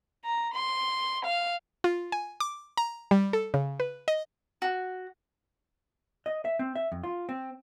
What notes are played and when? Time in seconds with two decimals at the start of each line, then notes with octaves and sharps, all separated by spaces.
0.25 A#5
0.54 C6
1.25 F5
1.84 F4
2.12 G#5
2.40 D6
2.77 A#5
3.11 G3
3.33 A4
3.54 C#3
3.80 B4
4.08 D#5
4.62 F#4
6.26 D#5
6.45 E5
6.59 C4
6.75 E5
6.92 F2
7.04 F4
7.29 C4